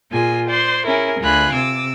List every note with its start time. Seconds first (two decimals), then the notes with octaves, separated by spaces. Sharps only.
0.11 A#2 F4 G#4 G#5
0.47 C5 D5 C6
0.85 C#4 E4 G#4 A#4
1.21 D2 F4 G#5 B5 F#6
1.53 C3 D6 E6